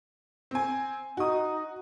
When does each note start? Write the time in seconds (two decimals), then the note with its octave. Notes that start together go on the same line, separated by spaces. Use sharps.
0.51 C4 G#5
1.17 D#4 F#4 D#6